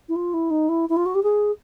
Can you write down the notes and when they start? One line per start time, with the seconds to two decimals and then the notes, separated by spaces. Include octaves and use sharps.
0.09 E4
0.16 F4
0.34 E4
0.51 D#4
0.69 E4
0.89 E4
0.97 F4
1.06 F#4
1.15 G4
1.23 G#4